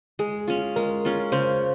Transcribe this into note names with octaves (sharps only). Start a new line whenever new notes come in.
G#3 G#4
C#4 F4
G#3 A#4
C#4 F4
C#3 C5